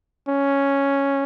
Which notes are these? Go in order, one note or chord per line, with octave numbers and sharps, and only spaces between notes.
C#4